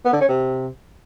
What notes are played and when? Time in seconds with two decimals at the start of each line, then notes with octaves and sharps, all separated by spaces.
0.05 B3
0.13 D3
0.21 C#4
0.28 C3